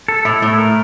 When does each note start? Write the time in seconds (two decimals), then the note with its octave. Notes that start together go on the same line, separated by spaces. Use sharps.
0.08 A4
0.25 A2 E4
0.42 A2 A3
0.58 A#4